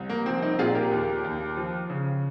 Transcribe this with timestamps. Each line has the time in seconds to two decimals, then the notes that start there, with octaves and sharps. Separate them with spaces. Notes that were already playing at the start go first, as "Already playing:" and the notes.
Already playing: C2
0.09 A#3
0.26 F3 C4
0.42 C4 D#4
0.59 A#2 F4 G#4
0.75 G4 A#4
0.92 D#2
1.24 D#2
1.57 F3
1.90 C#3